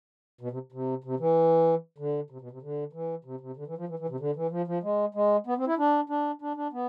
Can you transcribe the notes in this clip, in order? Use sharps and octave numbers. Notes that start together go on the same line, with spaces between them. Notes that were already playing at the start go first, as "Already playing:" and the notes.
B2
C3
C3
C3
E3
D3
C3
B2
C3
D3
E3
C3
C3
D3
E3
F3
E3
E3
C3
D3
E3
F3
F3
G#3
G#3
B3
C4
E4
D4
D4
D4
D4
B3